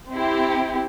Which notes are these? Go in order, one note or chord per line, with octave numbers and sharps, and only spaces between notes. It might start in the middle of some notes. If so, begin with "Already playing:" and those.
C4 E4 G4